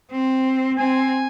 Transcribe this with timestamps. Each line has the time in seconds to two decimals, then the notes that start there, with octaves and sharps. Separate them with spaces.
0.11 C4
0.78 C4 G#5